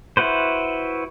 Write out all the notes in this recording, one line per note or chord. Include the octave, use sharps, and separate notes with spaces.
E4 F#4 B4 C5